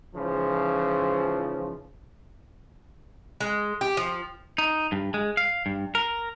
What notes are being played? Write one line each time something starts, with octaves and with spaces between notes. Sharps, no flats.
G#2 C#3 E3 F3
G#3
G4
F3
D#4
G2
G#3
F5
G2
A#4